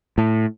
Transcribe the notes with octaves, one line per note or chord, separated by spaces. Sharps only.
A2